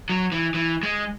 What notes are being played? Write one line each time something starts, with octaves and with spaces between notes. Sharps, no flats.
F#3
E3
E3
G#3